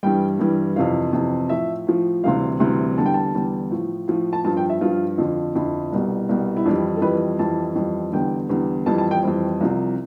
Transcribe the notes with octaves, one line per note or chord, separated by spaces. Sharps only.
G2 E3 G3 G5
G2 E3 G3
F2 C3 E3 F5
F2 C3 E3
A2 F3 E5
A2 F3
D2 C3 E3 G3 F5
D2 C3 E3 G3
E2 D3 G3 A5
G5
A5
E2 D3 G3
A2 F3
A2 F3
A5
G2 F3 A5
G5
E5
G2 F3 F4
F2 D3 F3
F2 D3 F3 E4
C2 B2 G3
C2 B2 G3
E4
F2 E3 G3 D4
E4
A4
F2 E3 G3 B4
F2 E3 G3 A5
F2 E3 G3
E2 D3 G3 G5
E2 D3 G3
F2 E3 G3 A5
A5
G5
F2 E3 G3 C5
C2 C3 F3